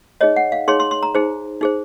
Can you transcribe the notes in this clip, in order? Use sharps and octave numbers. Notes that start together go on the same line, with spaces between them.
D#4 G#4 C#5 D#5
F#5
F5
D#4 G#4 C#5 C6
C6
C6
A#5
D#4 G#4 C5
D#4 G#4 C5